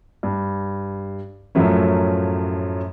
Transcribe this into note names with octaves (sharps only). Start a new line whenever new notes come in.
G2
F#2 A2 F3 F#3 A3 C#4